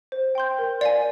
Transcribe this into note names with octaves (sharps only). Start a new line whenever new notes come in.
C5
G5 C6 G6
A#4
D5 F5 G#5